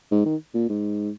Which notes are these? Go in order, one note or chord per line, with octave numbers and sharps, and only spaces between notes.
G#2
D#3
A#2
G#2